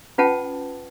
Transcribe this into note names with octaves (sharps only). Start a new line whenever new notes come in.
C#4 F4 B4 F#5 G5 A5